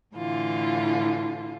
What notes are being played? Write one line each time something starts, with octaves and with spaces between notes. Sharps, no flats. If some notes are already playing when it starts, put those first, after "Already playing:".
A2 D3 E3 F4